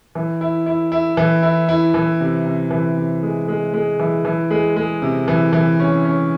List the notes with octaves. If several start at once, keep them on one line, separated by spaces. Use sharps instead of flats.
E3
E4
E4
E4
E3
E4
E4
E3
C3
C3
E3
C3
G#3
G#3
G#3
E3
E3
G#3
G#3
C3
E3
E3
C#4
C#4